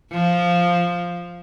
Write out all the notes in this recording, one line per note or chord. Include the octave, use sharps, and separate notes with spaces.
F3